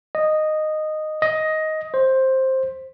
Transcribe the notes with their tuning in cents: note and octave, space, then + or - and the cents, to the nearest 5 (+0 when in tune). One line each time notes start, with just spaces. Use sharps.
D#5 -10
D#5 +10
C5 +10